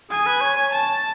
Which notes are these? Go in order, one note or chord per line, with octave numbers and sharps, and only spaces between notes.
G#4 G#5
B4
C#5
C#5
A5